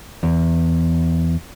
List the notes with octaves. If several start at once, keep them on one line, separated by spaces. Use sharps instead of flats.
E2